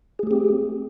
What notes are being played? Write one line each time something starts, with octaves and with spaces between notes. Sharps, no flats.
A3 C4 G4 G#4